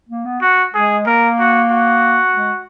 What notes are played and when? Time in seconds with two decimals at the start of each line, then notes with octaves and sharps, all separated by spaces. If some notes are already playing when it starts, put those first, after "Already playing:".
0.09 A#3
0.25 B3
0.41 F#4
0.74 G#3 G#4
1.06 A#3 A#4
1.39 F#4
1.71 F#4
2.35 G#3